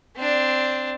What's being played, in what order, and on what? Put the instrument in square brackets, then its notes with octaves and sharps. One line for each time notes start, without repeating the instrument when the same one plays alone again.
[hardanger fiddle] C4 D4